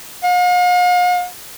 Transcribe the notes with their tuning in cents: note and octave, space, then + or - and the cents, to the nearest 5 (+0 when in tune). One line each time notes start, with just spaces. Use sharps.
F5 +45